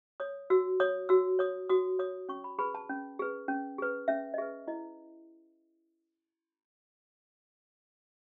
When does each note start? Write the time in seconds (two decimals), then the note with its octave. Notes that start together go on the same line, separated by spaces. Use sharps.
0.20 C#5 D#6
0.50 F#4 E6
0.80 C#5 D#6
1.09 F#4 E6
1.39 C#5 D#6
1.70 F#4 D#6
1.99 C#5 D#6
2.29 C#4 C#6
2.44 B5
2.59 G#4 B4 B5
2.75 A5
2.89 C#4
3.19 G#4 B4
3.48 C#4
3.78 G#4 B4
4.08 C#4 E5
4.34 D#5
4.38 G#4 B4 E5
4.68 E4 D#5